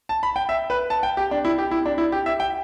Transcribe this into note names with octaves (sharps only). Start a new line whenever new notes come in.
A5
B5
G5
E5
B4
A5
G5
G4
D4
E4
G4
E4
D4
E4
G4
E5
G5